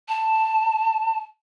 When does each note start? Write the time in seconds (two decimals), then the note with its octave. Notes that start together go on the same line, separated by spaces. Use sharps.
0.08 A5